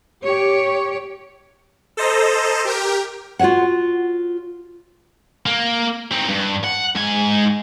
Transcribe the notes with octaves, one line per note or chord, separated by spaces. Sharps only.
G4 C#5
A4 C5 D#5 A#5
G4 A#4 G5
F4 F#4 B4 C#5 F#5
A#3
C4 D#4
G2
F#5
G#2 G#5